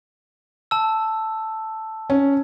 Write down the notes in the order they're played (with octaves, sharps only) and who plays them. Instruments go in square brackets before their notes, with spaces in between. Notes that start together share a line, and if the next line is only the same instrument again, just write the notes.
[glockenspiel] A5 E6
[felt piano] C#4